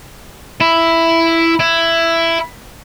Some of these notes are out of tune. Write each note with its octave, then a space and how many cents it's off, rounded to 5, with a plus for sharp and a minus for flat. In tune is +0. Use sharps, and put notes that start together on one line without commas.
E4 +5
E4 +10